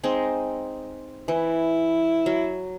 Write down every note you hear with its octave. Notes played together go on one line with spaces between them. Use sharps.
G#3 C4 D#4
E3 E4
F#3